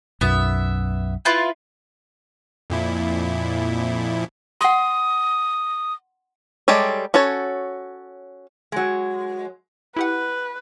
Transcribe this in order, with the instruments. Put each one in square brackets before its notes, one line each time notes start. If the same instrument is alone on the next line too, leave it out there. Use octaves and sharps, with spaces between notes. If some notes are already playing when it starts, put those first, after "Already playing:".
[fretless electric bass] B1 F#2 [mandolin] B3 E5
[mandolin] E4 F4 B4
[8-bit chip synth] F2 A#2 E4
[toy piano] F#5 C6 [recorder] D#6
[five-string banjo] G3 G#3 G4 A4 C#5
C#4 F#4 A4 C#5
[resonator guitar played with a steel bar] F#3 G#3
[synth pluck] E4 G4 F#5 [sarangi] B4